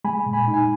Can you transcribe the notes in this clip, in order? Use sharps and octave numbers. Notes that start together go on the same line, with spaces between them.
G#3 G#5 B5
A#2
G#5 B5
D#4
G#5